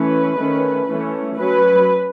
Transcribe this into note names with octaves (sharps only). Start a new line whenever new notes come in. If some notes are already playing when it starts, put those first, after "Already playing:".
Already playing: E3 A3 C#4 B4
D#3 A3 C#4
E3 A3 C#4
F#3 C#4 B4